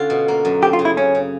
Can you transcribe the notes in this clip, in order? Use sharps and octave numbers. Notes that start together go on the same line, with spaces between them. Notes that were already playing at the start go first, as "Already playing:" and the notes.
Already playing: D3 C#4 F4
B2
A#3
F#2
C4 G4
F4
C#3
E4
C#3 C#4
C#3